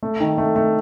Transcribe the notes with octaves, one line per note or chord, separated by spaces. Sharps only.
A3
D#3
A3
A3